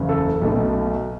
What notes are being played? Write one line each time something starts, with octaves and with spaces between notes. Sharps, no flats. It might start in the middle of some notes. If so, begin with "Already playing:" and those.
Already playing: F#1 E2 C#3
A4
B1 B2 A3